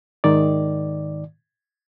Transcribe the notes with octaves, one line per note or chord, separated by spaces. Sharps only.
G#2 D#3 D5